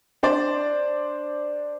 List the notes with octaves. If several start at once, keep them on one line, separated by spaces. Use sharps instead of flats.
D4 C5 D5